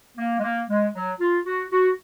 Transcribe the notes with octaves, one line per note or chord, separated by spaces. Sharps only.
A#3
G#3
A#3
G#3
F#3
F4
F#4
F#4